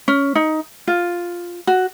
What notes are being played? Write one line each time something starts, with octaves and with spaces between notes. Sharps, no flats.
C#4
D#4
F4
F#4